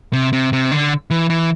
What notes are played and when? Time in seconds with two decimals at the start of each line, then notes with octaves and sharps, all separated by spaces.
0.13 C3
0.33 C3
0.53 C3
0.72 D3
1.10 E3
1.30 E3